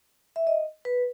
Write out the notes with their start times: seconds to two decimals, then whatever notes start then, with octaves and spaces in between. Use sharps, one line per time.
0.36 E5
0.47 D#5
0.85 B4